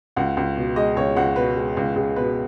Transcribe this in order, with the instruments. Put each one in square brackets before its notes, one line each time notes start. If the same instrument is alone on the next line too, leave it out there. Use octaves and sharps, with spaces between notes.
[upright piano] C#2 F#5
C#2
B2
G#3 D#5
C#2 C#5
C#2 F#5
B2 B4
G#3
C#2
C#2 G#4
B2 B4